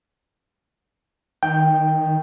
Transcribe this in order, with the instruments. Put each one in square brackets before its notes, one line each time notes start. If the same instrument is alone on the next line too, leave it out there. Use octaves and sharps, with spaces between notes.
[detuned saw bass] D#3 [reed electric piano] G5